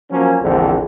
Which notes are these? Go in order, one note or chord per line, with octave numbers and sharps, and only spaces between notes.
F3 F#3 A#3 C#4
A#1 E2 G#2 D3 C4